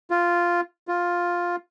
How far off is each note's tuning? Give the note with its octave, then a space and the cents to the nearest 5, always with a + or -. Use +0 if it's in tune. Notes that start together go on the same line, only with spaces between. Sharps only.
F4 -5
F4 +5